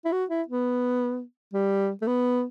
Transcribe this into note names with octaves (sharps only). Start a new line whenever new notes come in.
E4
F#4
E4
B3
G3
A3
B3